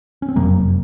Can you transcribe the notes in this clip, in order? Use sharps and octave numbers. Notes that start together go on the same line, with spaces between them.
C#4
C4
F#1 F2 C3 F#3 A#3